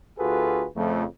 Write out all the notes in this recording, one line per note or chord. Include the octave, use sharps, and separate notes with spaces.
D2 F4 F#4 G#4 A4 B4
F2 C#3 F3 A3